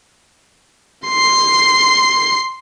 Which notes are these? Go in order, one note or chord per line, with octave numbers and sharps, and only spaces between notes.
C6 C7